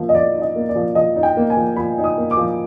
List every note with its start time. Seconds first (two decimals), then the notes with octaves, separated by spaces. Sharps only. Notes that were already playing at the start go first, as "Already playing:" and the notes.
Already playing: F3 A#3 E5
0.09 D#5
0.15 F3 D5
0.35 D#4
0.41 D#5
0.56 A#3
0.69 D5
0.76 F3
0.95 F3 D#5
1.16 D#4
1.23 G5
1.37 A#3
1.50 G#5
1.57 F3
1.76 F3 B5
1.98 D#4
2.04 D#6
2.18 A#3
2.31 D6
2.37 F3